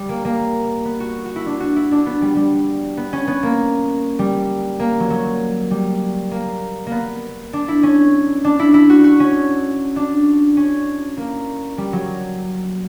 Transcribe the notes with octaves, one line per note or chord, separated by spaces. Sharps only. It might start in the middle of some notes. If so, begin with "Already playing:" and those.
Already playing: G3
A#3
A#3
B3
F#4
F#4
E4
D4
F#4
E4
D4
B3
G3
G3
B3
C#4
B3
A#3
G3
A#3
F#3
F#3
G3
A#3
A#3 B3
D4
E4
C#4
D4
E4
E4
F#4
F#4
C#4
D4
C#4
A#3
G3
F#3